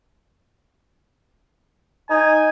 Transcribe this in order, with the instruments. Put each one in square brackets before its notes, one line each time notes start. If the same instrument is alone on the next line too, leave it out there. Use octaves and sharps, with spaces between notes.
[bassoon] D#4 [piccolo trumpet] G#5